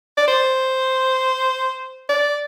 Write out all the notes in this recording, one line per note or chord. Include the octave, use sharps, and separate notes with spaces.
D5
C5
D5